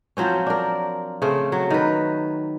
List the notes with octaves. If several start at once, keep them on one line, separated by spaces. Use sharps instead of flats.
F3 F#3 C4 C#4
D4 A#4
C#3 A3 C4
F#3
D#3 B4